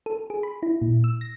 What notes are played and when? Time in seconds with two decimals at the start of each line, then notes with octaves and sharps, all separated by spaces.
0.06 A4
0.30 G#4
0.43 B5
0.63 E4
0.82 A#2
1.04 E6
1.21 A#6